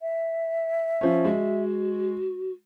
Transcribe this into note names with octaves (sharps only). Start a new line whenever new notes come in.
E5
F3 C#4
G#3 F#4